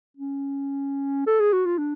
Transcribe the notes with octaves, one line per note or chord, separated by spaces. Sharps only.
C#4
A4
G#4
F#4
F4
D4